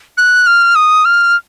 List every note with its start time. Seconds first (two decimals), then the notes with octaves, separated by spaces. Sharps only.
0.17 F#6
0.47 F6
0.75 D#6
1.05 F6